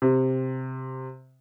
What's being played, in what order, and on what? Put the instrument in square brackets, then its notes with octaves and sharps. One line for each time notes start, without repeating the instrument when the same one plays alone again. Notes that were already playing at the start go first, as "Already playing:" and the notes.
[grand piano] C3